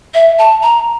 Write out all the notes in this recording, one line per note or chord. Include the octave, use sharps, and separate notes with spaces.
E5
A5
A#5